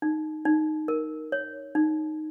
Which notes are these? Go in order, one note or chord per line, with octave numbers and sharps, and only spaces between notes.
D#4
D#4
A#4
C#5
D#4